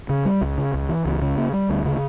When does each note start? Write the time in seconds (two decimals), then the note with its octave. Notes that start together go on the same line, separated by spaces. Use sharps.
0.09 C#3
0.25 G3
0.41 C#2
0.58 C#3
0.74 C#2
0.89 E3
1.05 C#2
1.22 C#3
1.38 A#3
1.53 G3
1.69 D2
1.85 C#3